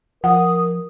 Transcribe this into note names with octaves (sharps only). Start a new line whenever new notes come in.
F3 A#4 F#5 D#6